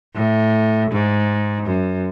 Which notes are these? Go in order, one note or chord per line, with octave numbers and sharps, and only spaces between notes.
A2
G#2
F#2